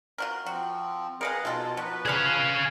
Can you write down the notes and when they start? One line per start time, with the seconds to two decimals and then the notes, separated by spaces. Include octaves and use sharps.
0.18 F4 F#4 A#4
0.46 F3 C4 F#4
1.21 G#4 A#4 B4 D#5 F5 F#5
1.45 B2 D#3 G#3 F4 A4
1.77 F3 F#3 B4
2.05 C#4 G#4 D#5 F5 B5